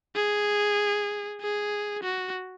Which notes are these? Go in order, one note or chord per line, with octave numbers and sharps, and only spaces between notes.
G#4
G#4
F#4